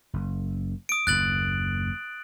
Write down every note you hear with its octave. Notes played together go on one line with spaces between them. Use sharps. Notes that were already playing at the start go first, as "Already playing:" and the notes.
F#1
D#6 D7
F#1 D#2 F#6 A6 F#7